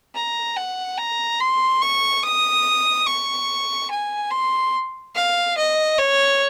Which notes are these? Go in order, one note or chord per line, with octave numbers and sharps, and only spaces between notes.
A#5
F#5
A#5
C6
C#6
D#6
C#6
G#5
C6
F5
D#5
C#5